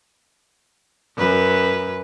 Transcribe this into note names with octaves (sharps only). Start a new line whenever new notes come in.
F#2 B4